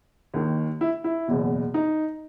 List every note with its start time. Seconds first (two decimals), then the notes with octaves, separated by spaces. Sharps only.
0.34 D#2 D#3
0.81 E4
1.04 E4
1.28 F#1 E2 B2
1.74 D#4